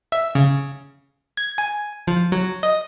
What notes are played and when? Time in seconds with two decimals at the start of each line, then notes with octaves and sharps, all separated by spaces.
0.12 E5
0.35 C#3
1.37 G#6
1.58 G#5
2.07 F3
2.32 F#3
2.63 D#5